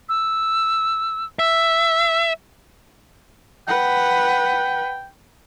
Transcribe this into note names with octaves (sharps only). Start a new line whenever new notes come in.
E6
E5 E6
B4 F#5 G5